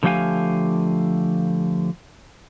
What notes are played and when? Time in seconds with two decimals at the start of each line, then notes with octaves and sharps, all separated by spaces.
0.03 D3 F3 A3 G4 F5 G#5